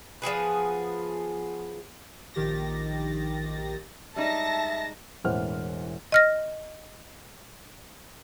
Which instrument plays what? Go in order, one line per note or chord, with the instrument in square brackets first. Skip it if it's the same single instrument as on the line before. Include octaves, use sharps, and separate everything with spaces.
[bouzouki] F3 B3 G#4 B4
[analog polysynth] A#1 D#3 G4 A6 A#6
[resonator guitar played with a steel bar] G3 G#3 D#4 [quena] E5 [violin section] A5 A#6
[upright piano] E1 A1 E3 C5 F#5 F6
[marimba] D#5 F6 A#6